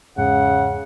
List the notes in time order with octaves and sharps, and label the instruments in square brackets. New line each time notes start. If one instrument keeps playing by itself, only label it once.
[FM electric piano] E2 G#2 [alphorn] C#3 [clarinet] F#5